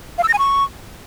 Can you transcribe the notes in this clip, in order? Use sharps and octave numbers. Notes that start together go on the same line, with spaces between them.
F5
E6
A#6
G#5
C#6